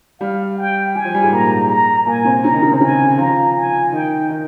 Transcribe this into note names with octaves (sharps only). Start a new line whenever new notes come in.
G3 F5
G5
G3 G#5
F3
G3
G#2 G#3
A#2 A#3 A#5
A#5
A#2 A#3 G#5
C3 C4
C#3 C#4 A#5
D#3 D#4
C#3 C#4
C3 C4
C#3 C#4 G#5
F3 F4 A#5
G#5
D#3 D#4 G5
D#3 D#4